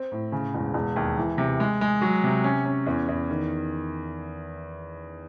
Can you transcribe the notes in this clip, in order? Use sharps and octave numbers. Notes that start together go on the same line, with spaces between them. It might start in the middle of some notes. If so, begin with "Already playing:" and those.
Already playing: C4
A2
C#3
E1
E1
D#2
E3
C3
G#3
G#3
F#3
C3
C#4
C#4
E2
E2
D#3